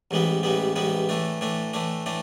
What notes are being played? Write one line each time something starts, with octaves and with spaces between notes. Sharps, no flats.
A1 G#2 E3 G3 B3
A1 G#2 E3 G3 B3
A1 G#2 E3 G3 B3
A2 E3 A3 D4
A2 E3 A3 D4
A2 E3 A3 D4
A2 E3 A3 D4